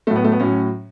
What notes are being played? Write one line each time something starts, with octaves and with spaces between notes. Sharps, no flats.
A2 F#3 A3
B3
A3
B3
A2 F#3 C#4